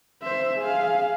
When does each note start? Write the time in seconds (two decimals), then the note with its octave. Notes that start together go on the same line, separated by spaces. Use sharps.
0.23 C5 E5
0.58 G#4 F5